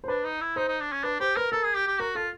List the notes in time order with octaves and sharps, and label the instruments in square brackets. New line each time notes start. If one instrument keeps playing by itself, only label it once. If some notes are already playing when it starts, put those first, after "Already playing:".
[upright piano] C5
[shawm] D4 [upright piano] B4
[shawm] D#4
E4
[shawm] D#4 [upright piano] C5
[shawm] D#4
D4
C#4
[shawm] D4 [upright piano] B4
[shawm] G4 [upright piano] C5
[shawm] A#4 [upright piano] B4
[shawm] A4 [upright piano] A#4
[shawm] G#4
G4
G4
[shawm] F#4 [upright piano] A#4
[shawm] F4 [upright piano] A4